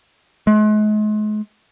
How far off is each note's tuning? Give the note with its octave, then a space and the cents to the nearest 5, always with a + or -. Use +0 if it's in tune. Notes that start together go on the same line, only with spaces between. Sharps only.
G#3 +40